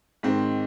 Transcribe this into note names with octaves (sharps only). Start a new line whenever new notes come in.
G#2 D#3 C4